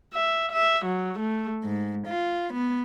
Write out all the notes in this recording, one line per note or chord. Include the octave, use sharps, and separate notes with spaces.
E5
E5
F#3
A3
G#2
F4
B3